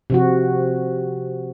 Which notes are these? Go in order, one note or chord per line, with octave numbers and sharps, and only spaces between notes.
C3 F3 F#4